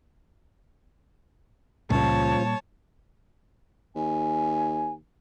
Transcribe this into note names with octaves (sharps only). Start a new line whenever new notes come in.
C#2 A#2 C#3 F3 G3 C#5 A5
D#2 G#5